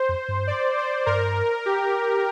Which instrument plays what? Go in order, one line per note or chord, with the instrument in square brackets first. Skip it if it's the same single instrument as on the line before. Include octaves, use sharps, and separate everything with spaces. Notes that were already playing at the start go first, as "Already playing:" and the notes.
Already playing: [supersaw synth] C5
[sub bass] F2
G2
[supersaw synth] D5
C5
[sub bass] G2 [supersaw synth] A#4
[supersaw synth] G4